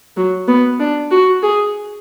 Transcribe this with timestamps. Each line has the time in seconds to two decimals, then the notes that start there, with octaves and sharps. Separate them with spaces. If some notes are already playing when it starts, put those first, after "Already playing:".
0.17 F#3
0.48 B3
0.80 D4
1.11 F#4
1.43 G#4